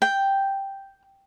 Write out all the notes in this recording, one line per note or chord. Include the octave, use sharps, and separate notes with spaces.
G5